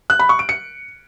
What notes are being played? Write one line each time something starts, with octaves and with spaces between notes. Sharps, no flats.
F#6
B5
C#6
D7
C#7